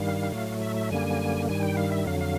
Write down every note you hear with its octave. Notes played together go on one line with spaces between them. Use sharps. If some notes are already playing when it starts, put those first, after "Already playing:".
Already playing: G2 D#3 G3 F5
A2 F#3 A3
E5
E5
F#2 D3 G3 A#3 G#5
G2 D#3 G3 G#5
G5
F5
E5
F2 D3 F#3 F5
F5